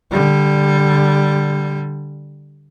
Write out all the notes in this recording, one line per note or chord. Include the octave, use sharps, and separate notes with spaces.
D3 G3